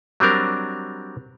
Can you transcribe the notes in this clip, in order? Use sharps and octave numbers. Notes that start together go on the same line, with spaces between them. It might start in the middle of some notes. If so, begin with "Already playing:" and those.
F#3 G3 C4 D4 A#4